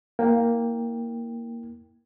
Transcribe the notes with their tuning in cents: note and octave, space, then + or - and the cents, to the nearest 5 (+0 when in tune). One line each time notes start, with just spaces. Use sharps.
A#3 +0 E4 -30 G5 +10